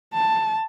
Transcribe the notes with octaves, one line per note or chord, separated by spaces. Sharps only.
A5